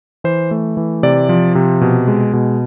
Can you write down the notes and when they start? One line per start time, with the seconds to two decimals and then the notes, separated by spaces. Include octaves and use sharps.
0.24 E3 C5
0.51 A3
0.77 E3
1.03 C3 D5
1.29 F3
1.55 C3
1.81 B2
2.08 G#3
2.33 B2